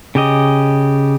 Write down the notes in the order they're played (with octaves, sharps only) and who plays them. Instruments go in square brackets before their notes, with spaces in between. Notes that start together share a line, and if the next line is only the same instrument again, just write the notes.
[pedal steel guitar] C#3 G4 D#5